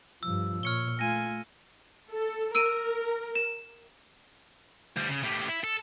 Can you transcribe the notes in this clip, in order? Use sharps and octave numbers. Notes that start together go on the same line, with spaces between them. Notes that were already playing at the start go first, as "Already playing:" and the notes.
G2 F3 E6
A#2 C#5 F6 C#7 G7
A3 F4 G#5 A#6 D#7
A4
A#4 E6 D7 D#7
E7
D2 G3
C#3
A2 G3
E4
A4